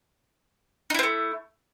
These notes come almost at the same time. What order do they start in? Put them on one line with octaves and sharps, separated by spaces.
D#4 E4 C4 A3